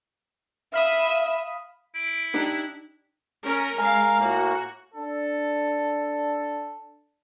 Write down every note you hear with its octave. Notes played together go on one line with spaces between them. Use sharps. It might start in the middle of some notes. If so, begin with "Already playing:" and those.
E5 F5 B5 D#6
E4 D7
D4 D#4 G4 F#6
C#4 A#4
G#3 A#4 F5 G#5 A#5
A2 A#3 F#4
D4 A4